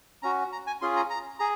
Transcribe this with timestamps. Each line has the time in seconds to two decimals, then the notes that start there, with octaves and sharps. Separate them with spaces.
0.22 C#4 F#4 A#5
0.52 A#5
0.67 G#5
0.81 C#4 F4 G#4 C6
0.96 A#5
1.10 A#5
1.39 G#4 A#5